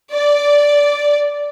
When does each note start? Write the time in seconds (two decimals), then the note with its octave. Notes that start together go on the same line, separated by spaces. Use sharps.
0.13 D5